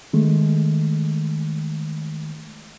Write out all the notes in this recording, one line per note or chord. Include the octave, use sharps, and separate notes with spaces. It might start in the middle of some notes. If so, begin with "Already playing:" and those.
D#3 G#3 A3